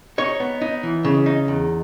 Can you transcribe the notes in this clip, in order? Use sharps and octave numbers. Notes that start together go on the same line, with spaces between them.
D#4 C#5
B3
D#4
E3
C#3
D#4
E2